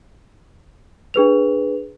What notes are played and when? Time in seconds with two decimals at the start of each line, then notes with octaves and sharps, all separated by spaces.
1.14 D4 G#4 B4 F7